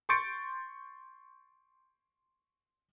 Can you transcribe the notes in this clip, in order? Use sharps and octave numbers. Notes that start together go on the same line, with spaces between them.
C6 C#6 G6 A6 C#7 D7